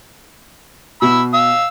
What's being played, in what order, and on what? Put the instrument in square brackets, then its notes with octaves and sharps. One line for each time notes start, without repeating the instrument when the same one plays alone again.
[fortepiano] B2 [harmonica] B5 E6
[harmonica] F5 E6